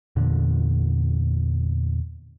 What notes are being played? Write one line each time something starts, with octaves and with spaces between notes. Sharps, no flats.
E2 A#2 D3